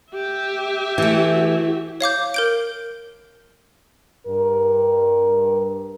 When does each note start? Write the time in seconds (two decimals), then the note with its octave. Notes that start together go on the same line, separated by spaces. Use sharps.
0.13 G4 E5
0.98 E3 A3
2.01 C#5 F5 D6 G6
2.34 A#4 G6 D7
4.27 G2 A#4